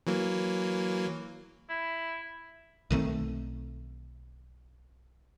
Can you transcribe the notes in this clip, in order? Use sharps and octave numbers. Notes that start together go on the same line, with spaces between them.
E3 F#3 A#3
E4
B1 D#3 A3 C4